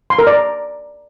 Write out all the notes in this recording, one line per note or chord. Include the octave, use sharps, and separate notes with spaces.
C6
A#4
D5